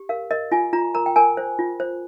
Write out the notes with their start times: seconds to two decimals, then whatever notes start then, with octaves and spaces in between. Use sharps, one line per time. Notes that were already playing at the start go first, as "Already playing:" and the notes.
Already playing: G4
0.09 A#4 F5
0.31 A#4 D#5
0.52 F4 G#5
0.73 F4 A#5
0.95 A#4 A#5
1.06 G5
1.16 A#4 G#5
1.37 C5
1.59 F4
1.80 C5